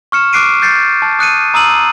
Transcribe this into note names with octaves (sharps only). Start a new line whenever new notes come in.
C#6 F6 C#7 E7
D6 F#6 C7 D7 D#7
G6 A6 C7 C#7
A5
D#6 F#6 C#7 D#7
A#5 D#6 E6 D#7 F#7